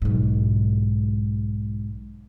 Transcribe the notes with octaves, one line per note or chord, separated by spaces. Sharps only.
B1 G#2